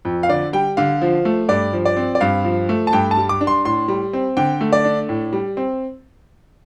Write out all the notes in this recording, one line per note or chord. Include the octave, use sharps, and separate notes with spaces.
F2
F5
D3 D5
G3 G5
D3 F5
F3
A3
G2 D5
F3
D5
C4
D5
G2 F5
F3
A3
A5
G2 G5
A5
G3
D6
D4
C6
A2 C6
G3
C4
D3 G5
A3
D5
D4
A2
G3
C4